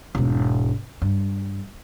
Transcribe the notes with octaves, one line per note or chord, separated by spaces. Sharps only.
E1 G#2
G2